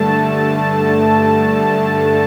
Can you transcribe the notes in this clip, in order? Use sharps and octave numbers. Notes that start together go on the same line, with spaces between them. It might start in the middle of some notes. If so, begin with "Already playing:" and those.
Already playing: G2 D3 A3 A5